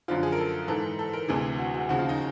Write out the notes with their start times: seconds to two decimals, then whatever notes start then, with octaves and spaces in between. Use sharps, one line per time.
0.08 F#2 D3 F3 F4
0.23 G#4
0.32 A#4
0.38 A4
0.68 G#2 E3 A4
0.99 A4
1.13 A#4
1.28 D2 C3 E3 G#4
1.58 F#4
1.74 F#4
1.89 D#2 C#3 F3 F#4
1.99 F4
2.09 D#4